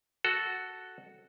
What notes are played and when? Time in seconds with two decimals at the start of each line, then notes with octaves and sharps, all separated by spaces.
0.24 F#4 A4